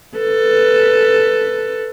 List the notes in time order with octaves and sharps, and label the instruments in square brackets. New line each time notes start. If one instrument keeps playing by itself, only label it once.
[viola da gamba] A4 B4